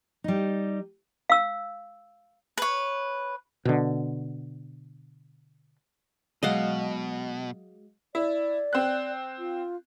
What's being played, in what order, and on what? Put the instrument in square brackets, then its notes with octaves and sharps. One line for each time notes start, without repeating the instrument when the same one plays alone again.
[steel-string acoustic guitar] G3 D#4
[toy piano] F5 E6
[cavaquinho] B4 C#5
[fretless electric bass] B2 D3
[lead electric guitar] B2 [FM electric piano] F#3 G#3 [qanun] D#5 F5 F#5
[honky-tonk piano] E4 [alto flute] D5
[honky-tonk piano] C4 F#6
[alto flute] F4